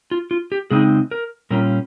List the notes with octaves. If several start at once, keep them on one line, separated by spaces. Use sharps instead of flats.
F4
F4
G4
C#3 G#3 C4 D#4 G#4
A#4
A#2 G3 C#4 F4 A#4